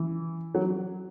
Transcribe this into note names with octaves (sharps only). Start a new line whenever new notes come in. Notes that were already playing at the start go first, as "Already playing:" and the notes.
Already playing: E3
F#3